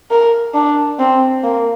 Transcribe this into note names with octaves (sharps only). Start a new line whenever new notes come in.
A#4
D4
C4
A#3